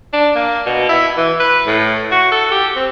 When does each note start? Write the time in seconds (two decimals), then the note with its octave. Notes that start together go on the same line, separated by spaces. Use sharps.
0.13 D4
0.35 A#3
0.66 B2
0.89 E4
1.17 E3
1.40 B4
1.67 A2
2.12 F#4
2.32 A4
2.51 G4
2.76 C4